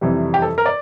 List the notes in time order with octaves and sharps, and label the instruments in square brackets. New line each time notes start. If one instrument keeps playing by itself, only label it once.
[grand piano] F2 C3 E3 G3
G4
A4
A#4
D5